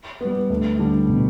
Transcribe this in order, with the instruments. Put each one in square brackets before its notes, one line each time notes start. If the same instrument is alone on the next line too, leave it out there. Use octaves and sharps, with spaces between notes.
[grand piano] G3 B3
D2
D3 G3 D4
[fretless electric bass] B2